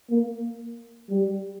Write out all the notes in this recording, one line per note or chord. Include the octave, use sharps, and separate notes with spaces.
A#3
G3